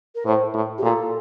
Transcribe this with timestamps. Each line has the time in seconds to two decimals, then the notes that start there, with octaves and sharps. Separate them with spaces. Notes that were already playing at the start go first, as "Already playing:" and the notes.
0.15 A#4
0.26 A2 C5
0.54 A2
0.78 G4
0.83 A#2 A4